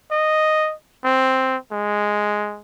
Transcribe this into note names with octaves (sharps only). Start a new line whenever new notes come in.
D#5
C4
G#3